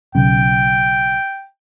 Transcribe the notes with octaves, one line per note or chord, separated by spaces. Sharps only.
B1 C#3 G5